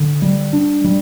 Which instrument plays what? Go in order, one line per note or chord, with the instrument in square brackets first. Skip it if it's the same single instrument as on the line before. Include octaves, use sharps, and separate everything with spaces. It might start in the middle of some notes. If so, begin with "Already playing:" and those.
Already playing: [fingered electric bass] D3
G3
D4
G3